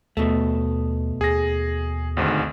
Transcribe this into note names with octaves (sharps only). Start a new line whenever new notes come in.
D#2 B2 A3
D#2 G#4 A#6
G#1 D2 G#2